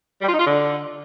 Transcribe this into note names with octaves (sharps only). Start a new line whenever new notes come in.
G3
F4
D#4
F4
D3